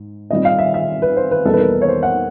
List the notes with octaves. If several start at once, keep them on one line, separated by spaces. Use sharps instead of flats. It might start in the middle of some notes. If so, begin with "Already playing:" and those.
Already playing: G#2
A#2 G3 C4 D#5
F5
E5
E5
B4
C5
B4
E2 B2 G3 A#3 D#4 A4
B4
A#4
B4
C#5
C5
F#5